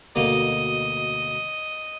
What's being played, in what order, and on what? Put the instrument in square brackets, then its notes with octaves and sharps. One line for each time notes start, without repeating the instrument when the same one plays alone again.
[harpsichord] D2 B2 A#3 [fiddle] D#5